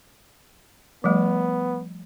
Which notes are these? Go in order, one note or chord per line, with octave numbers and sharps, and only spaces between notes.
F3 G3 A3 B3